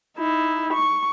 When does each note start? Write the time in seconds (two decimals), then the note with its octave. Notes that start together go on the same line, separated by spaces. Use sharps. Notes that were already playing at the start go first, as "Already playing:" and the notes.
0.18 D#4 E4
0.74 C#6